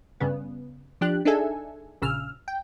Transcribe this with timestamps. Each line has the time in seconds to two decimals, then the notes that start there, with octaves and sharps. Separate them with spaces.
0.20 G2 C#3 B3
1.01 F3 D4 G4 F#6
1.25 D4 D#4 G#4 A4 E5 G#5
2.02 A#1 C#3 E6 F6
2.48 G5